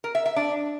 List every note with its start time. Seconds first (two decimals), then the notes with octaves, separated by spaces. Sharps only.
0.04 A#4
0.15 E5
0.26 E5
0.36 D4